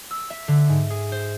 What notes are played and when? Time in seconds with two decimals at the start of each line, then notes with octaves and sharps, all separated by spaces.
0.11 E6
0.30 E5
0.48 D3
0.69 G#2
0.90 G#4
1.12 C5